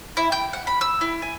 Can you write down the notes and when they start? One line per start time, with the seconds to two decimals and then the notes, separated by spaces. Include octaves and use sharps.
0.17 E4
0.32 G5
0.53 F#5
0.67 B5
0.81 E6
1.01 E4
1.22 G#5